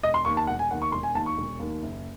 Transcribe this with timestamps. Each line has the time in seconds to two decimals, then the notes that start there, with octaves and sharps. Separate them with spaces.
0.03 E1 D#5
0.14 C6
0.25 D#2 D#3 C#6
0.37 A5
0.47 E1 F#5
0.59 G#5
0.70 D#2 F#5
0.74 D#3
0.82 C#6
0.92 E1 C6
1.03 G#5
1.15 D#2 D#3 A5
1.26 C#6
1.37 E1
1.60 D#2 D#3
1.82 F#1